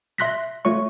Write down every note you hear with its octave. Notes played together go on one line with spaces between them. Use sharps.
E5 C6 F#6 A#6 B6
A3 F4 C#5 C#6